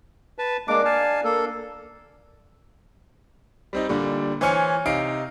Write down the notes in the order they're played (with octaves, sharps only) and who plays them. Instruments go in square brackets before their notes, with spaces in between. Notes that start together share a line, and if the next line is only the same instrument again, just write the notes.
[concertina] B4 A5
[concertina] G#3 A#3 D6 [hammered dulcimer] D4 A#5
[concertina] F5 G#5 A5
A#3 A4
[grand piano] G3 C4 D#4
A#2 D3 G3
E3 C5 C#5 G#5 F6 C#7
C3 D#4 F5 C7 D7